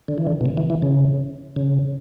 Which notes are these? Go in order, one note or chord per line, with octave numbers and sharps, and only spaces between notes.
D3
E3
D3
B2
C#3
E3
E3
C#3
C#3